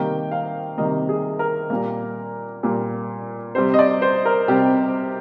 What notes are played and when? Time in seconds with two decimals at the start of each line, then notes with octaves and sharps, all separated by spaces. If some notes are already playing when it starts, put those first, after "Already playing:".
Already playing: C3 D#3 G3 A#3 G5
0.32 F5
0.78 C3 D#3 G3 A#3 D#5
1.09 G#4
1.39 A#4
1.70 A#2 G3 A#3
2.63 A#2 G3 A#3
3.55 C3 G3 C4 C5
3.74 D#5
3.79 D5
4.02 C5
4.25 A#4
4.48 C3 G3 C4 G4